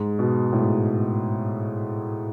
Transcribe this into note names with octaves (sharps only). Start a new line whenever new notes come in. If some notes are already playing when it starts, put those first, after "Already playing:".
Already playing: G#2
B2
A2
G#2